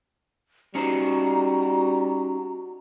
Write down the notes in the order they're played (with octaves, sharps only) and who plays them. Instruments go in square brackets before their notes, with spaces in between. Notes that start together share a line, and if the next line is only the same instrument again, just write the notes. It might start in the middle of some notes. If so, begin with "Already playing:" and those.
[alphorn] G3 [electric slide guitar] C#4 D#4 C5 [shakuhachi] F#4 [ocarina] A#5